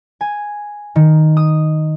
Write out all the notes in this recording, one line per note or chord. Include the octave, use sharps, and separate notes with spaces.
G#5
D#3
D#6